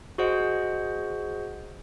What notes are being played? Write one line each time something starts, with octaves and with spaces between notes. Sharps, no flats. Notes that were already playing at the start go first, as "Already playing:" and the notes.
F#4 G#4 C5 D#5 F#5